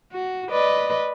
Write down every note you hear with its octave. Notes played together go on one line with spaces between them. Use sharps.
F#4
B4 D5 D#5